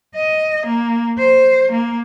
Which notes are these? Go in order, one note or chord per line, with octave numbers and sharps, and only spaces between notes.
D#5
A#3
C5
A#3